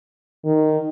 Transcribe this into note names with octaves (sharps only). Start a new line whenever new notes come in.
D#3